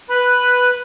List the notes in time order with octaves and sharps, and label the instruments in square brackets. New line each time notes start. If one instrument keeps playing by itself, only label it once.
[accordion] B4 B5